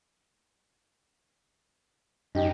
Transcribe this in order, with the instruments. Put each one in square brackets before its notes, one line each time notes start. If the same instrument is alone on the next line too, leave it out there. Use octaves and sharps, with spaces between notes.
[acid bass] F#2 [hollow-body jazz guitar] D#4 G4